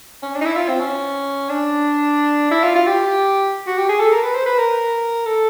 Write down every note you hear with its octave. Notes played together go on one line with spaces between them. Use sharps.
C#4
D4
D#4
E4
F4
C4
C#4
D4
E4
F4
F4
G4
F#4
G4
G#4
A4
A#4
B4
C5
B4
A#4
A4